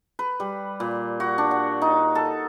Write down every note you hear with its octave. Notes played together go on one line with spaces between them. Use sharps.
B4
G3
A#2
F#4
D4
F#5
D#4
A4